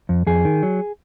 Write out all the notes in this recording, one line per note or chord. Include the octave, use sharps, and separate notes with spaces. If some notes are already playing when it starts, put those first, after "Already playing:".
F2
F2 G#4
D#3
F#3